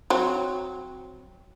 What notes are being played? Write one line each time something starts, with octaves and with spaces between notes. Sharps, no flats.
F#3 C4